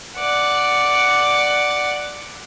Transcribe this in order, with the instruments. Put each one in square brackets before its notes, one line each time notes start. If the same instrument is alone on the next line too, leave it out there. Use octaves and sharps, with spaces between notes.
[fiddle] D5 F#5